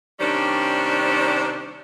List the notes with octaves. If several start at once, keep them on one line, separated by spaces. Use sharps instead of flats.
C3 D#3 G3 C#4 D4 C5